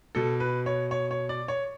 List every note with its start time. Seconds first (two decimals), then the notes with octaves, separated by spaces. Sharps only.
0.15 B2 A4
0.40 B4
0.66 C#5
0.91 C#5
1.11 C#5
1.29 D5
1.48 C#5